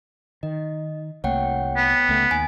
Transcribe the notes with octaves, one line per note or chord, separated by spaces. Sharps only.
D#3 D#5
C2 A3 A#3 C#5 F#5 G5
B3
C#2 A3
D#2 G#5